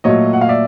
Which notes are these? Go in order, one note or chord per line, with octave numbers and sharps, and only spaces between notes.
A#2 F#3 A3 C#5 D#5
F#5
F5
D5 E5